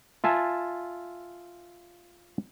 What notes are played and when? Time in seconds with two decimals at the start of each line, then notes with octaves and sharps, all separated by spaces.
0.24 F4 E5 G#5 A5